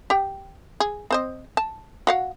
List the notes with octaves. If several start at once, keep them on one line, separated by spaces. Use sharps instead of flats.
G4 G5
G#4
C4 C5 D#5
A5
F#4 F5 F#5